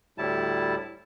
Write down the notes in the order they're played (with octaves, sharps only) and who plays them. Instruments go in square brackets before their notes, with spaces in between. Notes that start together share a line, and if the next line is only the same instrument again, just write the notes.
[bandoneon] D2 A2 G3 E4 A5